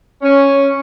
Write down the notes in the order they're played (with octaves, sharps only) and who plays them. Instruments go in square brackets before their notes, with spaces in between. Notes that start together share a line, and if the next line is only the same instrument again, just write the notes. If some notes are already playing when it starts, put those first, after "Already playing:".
[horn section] C#4